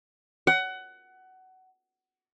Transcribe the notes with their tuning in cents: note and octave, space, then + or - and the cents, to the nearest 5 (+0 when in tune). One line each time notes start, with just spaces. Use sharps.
F#5 +20